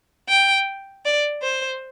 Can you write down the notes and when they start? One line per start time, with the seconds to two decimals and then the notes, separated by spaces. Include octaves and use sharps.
0.29 G5
1.05 D5
1.42 C5